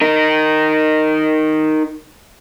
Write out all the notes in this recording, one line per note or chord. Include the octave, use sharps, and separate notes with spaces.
D#4 A#4